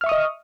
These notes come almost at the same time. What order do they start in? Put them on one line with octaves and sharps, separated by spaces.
F6 E5 C#6 D#6 D#5